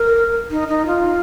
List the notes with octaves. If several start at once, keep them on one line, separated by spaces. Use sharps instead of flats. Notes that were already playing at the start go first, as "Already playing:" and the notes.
Already playing: A#4
D#4
D#4
F4